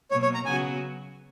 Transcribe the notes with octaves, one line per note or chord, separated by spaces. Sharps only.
B2 F#3 A#3 C#5
C#5
A#5
C#3 F#3 B3 F#4 G#5